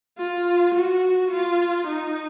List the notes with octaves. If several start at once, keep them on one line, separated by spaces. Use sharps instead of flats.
F4
F#4
F4
D#4